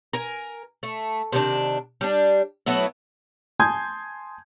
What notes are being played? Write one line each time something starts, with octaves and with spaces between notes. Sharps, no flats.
A#4 G#5
A3
C3 D#3 D4
G3 D4
F#3 A3 B3 E4
G#5 A5 C6 D#6 G6 G#6